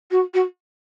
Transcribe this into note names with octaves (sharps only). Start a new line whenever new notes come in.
F#4
F#4